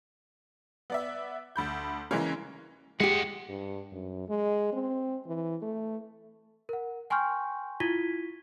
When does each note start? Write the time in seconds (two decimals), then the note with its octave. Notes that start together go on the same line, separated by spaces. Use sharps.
0.90 B3 D5 E5
1.56 D2 B5 G6
2.11 C#3 E3 G#3 A#3 C#4
3.00 G#3 G4 G#4 F#5
3.49 G2
3.92 F#2
4.29 G#3
4.73 C4
5.27 E3
5.62 A3
6.69 A#4 F#5
7.10 G5 G#5 C6 C#6 F6 G6
7.80 E4 F4 G#6 B6 D#7 G7